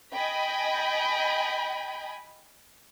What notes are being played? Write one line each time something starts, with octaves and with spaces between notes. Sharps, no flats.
D#5 G5 G#5 B5